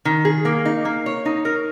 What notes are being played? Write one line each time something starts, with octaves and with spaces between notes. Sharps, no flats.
D#3
G#4
A#3
D#4
A#3
C#5
D#4
A#4